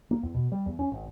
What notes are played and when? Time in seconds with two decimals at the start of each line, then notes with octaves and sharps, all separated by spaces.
0.11 A#3
0.23 E2
0.34 B2
0.52 G3
0.66 E2
0.79 C#4
0.92 G#1